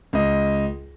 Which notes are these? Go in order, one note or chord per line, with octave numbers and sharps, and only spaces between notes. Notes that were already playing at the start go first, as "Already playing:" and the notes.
C#2 D#5